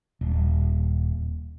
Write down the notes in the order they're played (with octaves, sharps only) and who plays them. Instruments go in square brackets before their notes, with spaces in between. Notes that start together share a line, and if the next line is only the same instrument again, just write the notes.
[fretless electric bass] D#1